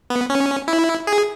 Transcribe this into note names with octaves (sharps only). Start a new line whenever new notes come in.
B3
C#4
E4
G#4